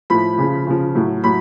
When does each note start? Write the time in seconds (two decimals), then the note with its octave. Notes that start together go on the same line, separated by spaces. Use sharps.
0.10 A2 F3 B5
0.38 C#3 F3
0.67 C#3 F3
0.95 A2 F#3
1.24 A2 F#3 B5